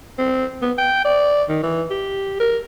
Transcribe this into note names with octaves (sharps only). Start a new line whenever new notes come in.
C4
B3
G5
D5
D#3
E3
G4
A#4